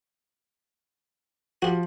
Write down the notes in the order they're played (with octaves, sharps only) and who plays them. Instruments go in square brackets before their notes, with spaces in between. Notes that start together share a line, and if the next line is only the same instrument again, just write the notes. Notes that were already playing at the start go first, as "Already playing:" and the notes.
[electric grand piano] F3 [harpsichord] F#4 G4